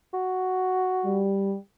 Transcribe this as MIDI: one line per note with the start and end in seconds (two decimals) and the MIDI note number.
0.13 1.25 66
1.05 1.54 55